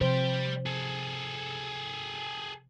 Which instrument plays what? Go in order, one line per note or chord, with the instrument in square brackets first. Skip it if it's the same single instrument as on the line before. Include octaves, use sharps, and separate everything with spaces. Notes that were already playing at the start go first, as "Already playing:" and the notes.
[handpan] C3 F3 C5 [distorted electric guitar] G3 G5
[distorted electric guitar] G#4 A4